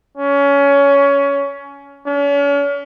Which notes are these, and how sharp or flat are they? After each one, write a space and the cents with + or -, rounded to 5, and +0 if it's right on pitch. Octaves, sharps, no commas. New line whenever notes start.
C#4 +20
C#4 +40